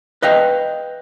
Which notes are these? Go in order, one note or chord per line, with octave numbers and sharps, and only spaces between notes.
B4 D#5 F5 G5